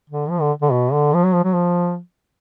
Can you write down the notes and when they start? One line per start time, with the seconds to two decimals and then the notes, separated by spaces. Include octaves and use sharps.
0.09 D3
0.29 F3
0.41 D3
0.62 D3
0.71 B2
0.92 D3
1.13 F3
1.24 F#3
1.33 F3
1.44 F#3
1.54 F3